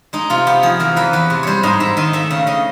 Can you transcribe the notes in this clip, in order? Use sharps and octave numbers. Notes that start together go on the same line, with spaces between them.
G#3 D#4
C3 F4
B3 G4
F3 G#4
E3 A#4
E2 B4
E2 B4
C3
G3 C5 C#5
G#2 D#5
G#2 E5
D#3 D#5
A3 E5
C#3
C#3 D#5